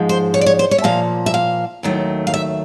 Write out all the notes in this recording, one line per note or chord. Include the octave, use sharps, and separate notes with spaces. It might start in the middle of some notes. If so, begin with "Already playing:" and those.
Already playing: G#2 F3 G#3
C5
C#5
D5
C#5
C5
C#5
E5
A#2 F3 A#3 F5
E5
F5
D#2 D#3 F#3 A3
F5
E5